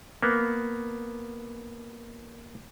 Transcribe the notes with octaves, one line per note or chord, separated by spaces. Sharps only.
A#3 B3